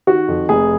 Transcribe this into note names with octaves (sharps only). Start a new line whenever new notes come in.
D#3 F#4
F2
F1 G#4